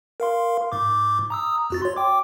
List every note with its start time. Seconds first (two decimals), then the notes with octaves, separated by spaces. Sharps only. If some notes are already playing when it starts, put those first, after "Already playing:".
0.20 A#4 F5 C6
0.72 G#2 D6
1.30 A#5 D#6 E6
1.70 F2 F#4 A6
1.82 C#5 C6
1.97 G5 D6